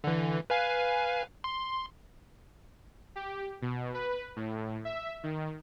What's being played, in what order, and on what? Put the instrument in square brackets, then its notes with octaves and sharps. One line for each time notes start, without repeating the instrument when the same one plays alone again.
[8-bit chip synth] D3 E3
B4 F5 G#5
C6
[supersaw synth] G4
B2
B4
A2
E5
D#3